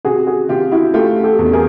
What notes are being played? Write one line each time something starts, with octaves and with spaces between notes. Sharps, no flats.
C3 F#4 G#4
F#4 G#4
C3 F4 G4
E4 F#4
A3 F4 G4
G4 A4
E2
G#4 A#4